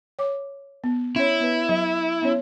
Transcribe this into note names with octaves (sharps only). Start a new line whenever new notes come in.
C#5 D6
B3
C#4 E4 C#5
B3 B4
F#3
B3 C#4 C#5